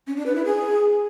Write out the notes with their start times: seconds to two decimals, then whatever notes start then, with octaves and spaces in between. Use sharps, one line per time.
0.07 C#4
0.17 D4
0.26 B4
0.35 E4
0.45 G#4